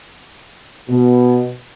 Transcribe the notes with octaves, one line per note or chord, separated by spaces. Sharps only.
B2